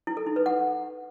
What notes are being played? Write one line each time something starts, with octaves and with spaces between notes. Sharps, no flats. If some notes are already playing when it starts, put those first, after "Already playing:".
E4
A4
D#4
B4
F#5